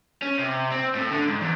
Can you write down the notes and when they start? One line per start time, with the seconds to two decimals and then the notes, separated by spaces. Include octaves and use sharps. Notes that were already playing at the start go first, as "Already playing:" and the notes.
0.22 C#4
0.38 C3
0.71 C4
0.95 A2
1.11 D3
1.27 G#2
1.42 E2